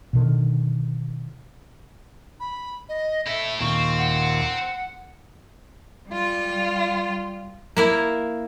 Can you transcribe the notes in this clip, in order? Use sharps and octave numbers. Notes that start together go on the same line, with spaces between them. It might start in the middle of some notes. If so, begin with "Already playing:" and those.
B2 D3 D#3
B5
D#5
E4 A4 E5
D#2 A#2 C4 C#6
F#5
G3 F4
A#3 E4 A#4